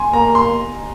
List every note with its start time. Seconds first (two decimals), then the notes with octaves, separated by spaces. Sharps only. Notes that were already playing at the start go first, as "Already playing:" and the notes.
Already playing: G#5 C6
0.13 A#3 A#5
0.35 C6